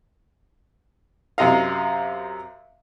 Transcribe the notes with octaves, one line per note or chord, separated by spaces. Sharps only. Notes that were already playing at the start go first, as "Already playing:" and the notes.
F#2 C3 D#5 F5